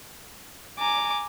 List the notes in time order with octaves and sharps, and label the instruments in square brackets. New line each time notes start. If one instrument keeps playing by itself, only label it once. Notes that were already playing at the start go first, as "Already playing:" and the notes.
[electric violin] G#5 A#5 [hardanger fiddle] D6